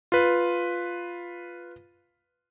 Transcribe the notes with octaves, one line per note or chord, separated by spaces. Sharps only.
F4 B4